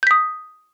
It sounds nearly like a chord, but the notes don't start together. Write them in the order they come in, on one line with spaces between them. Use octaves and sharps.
G6 B6 D#6